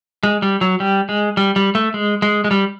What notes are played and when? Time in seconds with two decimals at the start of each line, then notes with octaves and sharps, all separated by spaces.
0.23 G#3
0.42 G3
0.61 F#3
0.80 G3
1.09 G#3
1.37 G3
1.56 G3
1.75 A3
1.94 G#3
2.22 G#3
2.44 G#3
2.51 G3